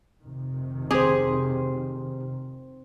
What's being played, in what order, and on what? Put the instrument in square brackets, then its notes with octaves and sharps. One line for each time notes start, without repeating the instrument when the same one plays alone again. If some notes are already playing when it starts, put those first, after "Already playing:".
[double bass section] F1 C3 D#3
[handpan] C4 C5 [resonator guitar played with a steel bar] G4 G#4